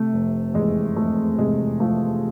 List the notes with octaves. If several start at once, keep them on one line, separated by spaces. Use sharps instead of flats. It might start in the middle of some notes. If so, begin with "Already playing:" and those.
Already playing: C3 A3
F1
E2 G#3
F1 A3
C3 G#3
F3 A3